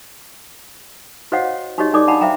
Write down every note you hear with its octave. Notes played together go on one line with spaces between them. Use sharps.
F#4 C5 C#5 D#5 F5 F#5
D#4 F#4 G4 C#5 D#5 C#6
D#4 A4 D5 D6
D4 F5 F#5 A5 B5
C5 E5 F5 G5 A#5